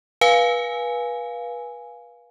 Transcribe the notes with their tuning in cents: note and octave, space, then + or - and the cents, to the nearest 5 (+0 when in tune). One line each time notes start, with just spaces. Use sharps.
B4 -30 F5 +0 G#5 +0